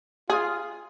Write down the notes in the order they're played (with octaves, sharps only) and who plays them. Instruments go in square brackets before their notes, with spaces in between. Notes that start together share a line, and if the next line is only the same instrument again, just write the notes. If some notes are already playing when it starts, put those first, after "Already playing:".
[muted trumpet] F4 [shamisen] G#4